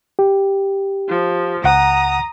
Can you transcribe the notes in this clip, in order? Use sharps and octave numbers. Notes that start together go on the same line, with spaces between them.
G4
F3
C#2 F#5 A#5 D#6